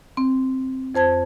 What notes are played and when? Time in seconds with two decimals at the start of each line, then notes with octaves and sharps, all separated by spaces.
0.17 C4
0.95 F2 C5 A5 G#6